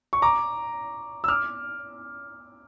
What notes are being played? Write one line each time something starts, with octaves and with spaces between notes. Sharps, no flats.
C#6
A#5 D6
E6
D6 F6